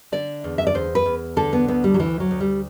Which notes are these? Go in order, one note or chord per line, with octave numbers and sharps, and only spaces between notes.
D3 D5
E2
E5
D5
E2 C5
B4
E2
D3 A4
B3
D2 B3
G3
F#3
D2 E3
F#3
D2
G3